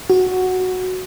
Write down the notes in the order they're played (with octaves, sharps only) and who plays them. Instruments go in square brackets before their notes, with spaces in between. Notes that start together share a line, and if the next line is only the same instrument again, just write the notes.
[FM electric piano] F#4